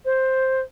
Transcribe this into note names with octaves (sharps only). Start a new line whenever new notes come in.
C5